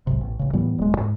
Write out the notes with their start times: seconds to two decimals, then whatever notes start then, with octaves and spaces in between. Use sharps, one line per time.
0.07 B1 G#2 C3
0.21 A1
0.39 A1 C#3
0.53 A2 E3 G3 B3
0.78 D#1 G#3
0.98 G#2